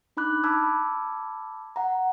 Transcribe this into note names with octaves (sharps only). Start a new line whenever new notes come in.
D4 D#4 B5 D6 F#6
A5 B5 D6 E6 F6 G#6
F#5 A#5